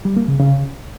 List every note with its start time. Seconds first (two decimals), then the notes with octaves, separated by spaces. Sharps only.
0.05 G3
0.17 A#3
0.28 C#3
0.39 C#3